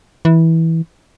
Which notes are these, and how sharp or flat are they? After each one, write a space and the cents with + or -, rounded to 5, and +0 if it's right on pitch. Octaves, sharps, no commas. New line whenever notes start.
E3 -15